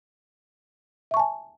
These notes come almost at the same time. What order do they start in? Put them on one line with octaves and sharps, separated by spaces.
E5 C#6 A5 G#5